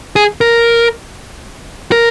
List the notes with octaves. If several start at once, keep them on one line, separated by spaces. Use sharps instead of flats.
G#4
A#4
A#4